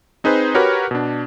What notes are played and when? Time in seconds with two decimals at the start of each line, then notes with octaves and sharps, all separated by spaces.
0.24 C4 D#4 G#4 B4 C5
0.55 F#4 G4 A#4 B4 C#5
0.91 B2 D4